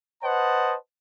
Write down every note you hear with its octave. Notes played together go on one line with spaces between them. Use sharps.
B4 C5 D#5 F#5 A5